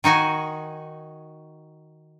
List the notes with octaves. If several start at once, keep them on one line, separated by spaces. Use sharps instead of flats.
D#3 D#4 F#4 G#5